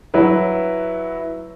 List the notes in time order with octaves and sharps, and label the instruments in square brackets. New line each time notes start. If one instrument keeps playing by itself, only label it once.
[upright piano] F#3 E4 B4